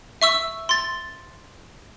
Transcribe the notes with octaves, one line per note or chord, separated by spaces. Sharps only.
E5 C#6 E6
C6 A6